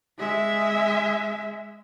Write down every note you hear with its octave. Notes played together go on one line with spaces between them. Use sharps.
G#3 E5